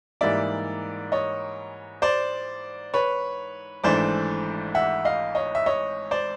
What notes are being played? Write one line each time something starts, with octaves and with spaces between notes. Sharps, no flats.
G#2 E3 G3 A#3 D#4 D5 E5
C#5 D#5
C5 D5
B4 C#5
G#1 G#2 E3 A3 D4 C5 D5
E5 F#5
D#5 F5
C#5 D#5
E5
C#5 D#5
C5 D5